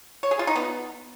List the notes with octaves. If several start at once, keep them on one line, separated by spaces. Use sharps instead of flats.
C#5
G#4
F4
D#4
B3